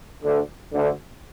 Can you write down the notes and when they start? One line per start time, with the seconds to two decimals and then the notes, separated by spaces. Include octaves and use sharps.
0.24 D2 D3
0.73 D2 D3